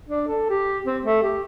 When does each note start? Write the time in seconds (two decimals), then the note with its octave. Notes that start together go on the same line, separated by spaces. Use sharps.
0.09 D4
0.27 A4
0.50 G4
0.85 C4
1.05 A3
1.22 G4